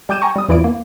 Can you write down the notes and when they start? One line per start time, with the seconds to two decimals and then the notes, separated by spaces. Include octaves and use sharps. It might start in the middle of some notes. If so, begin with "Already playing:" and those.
0.09 G3 G5 D6 G6 D#7 E7
0.22 G5 G#5 A#5 C#6
0.36 G3 D#6
0.49 E2 E3 E4 F4 D5 D7
0.64 A#3